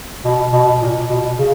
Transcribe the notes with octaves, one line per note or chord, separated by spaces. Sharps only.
B2
B2
A#2
B2
C#3